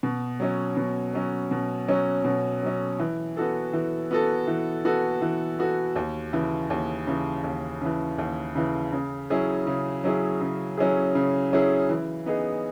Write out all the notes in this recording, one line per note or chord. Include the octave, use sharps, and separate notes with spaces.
B2
F#3 C#4
B2
F#3 C#4
B2
F#3 C#4
B2
F#3 C#4
E3
B3 F#4 A4
E3
B3 F#4 A4
E3
B3 F#4 A4
E3
B3 F#4 A4
D#2
C#3 E3
D#2
C#3 E3
D#2
C#3 E3
D#2
C#3 E3
C#3
F#3 C#4 E4 G#4
C#3
F#3 C#4 E4 G#4
C#3
F#3 C#4 E4 G#4
C#3
F#3 C#4 E4 G#4
E3
B3 D#4 G#4